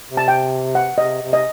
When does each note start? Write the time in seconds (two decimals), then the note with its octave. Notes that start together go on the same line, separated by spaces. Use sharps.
0.11 C3
0.17 A5
0.28 G5
0.75 F#5
0.98 C3 D#5
1.22 C3
1.33 D#5